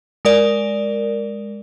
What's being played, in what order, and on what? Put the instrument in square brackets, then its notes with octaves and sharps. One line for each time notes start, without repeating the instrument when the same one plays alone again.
[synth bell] G#3 A#4 D5